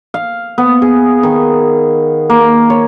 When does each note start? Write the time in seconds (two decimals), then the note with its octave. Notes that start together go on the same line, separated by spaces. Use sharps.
0.14 F5
0.58 B3
0.82 G#4
1.23 D#3
2.30 A#3
2.70 C#5